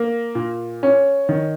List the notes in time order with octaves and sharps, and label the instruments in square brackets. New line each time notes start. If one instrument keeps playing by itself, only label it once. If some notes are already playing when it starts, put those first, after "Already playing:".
Already playing: [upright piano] A#3
A#2
C#4
D#3